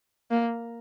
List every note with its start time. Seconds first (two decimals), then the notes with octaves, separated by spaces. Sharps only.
0.31 A#3